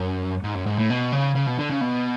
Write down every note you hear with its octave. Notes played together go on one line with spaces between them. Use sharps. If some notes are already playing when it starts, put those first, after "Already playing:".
Already playing: F#2
G#2
F#2
G#2
A2
B2
C#3
C#3
B2
D3
C#3
B2